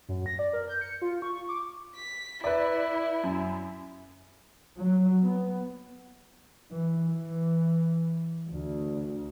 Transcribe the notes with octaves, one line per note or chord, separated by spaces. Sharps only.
F#2
A#6
D5
A#4
G6
C#7
F4
C#6
D6
B6
E4 B4 D5 E5
F#2
F#3
B3
E3
E3
D2